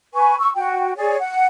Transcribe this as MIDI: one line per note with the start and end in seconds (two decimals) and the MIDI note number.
0.14 0.36 71
0.14 0.36 80
0.14 0.36 85
0.39 0.51 85
0.39 0.51 88
0.55 0.92 66
0.55 0.92 79
0.96 1.17 68
0.96 1.17 73
0.96 1.17 74
1.19 1.47 78